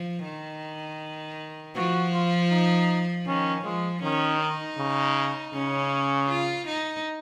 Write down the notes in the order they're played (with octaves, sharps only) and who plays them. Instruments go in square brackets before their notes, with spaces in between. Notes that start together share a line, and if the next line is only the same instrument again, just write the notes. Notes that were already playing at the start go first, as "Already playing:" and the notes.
Already playing: [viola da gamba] F3
D#3
[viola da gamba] F3 [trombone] F#4
[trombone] F4
D#4
[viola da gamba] D#3 [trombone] C#4
[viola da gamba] F3 [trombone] G#3
[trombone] D#3 [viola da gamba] C#4
[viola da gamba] D#4
[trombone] C#3
[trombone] C#3 [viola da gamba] C#4
[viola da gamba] F4
D#4